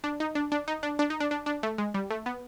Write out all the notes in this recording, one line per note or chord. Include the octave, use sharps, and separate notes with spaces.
D4
D#4
D4
D4
D#4
D4
D4
D#4
D4
D4
D4
A3
G#3
G3
A3
B3